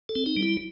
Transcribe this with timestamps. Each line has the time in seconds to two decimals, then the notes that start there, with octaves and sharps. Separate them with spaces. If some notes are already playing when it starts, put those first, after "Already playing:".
0.09 A4
0.15 C4
0.26 D#4
0.37 G3
0.42 E4